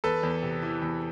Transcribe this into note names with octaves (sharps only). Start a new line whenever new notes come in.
E2 A4 B4
E2
C3
E3
E2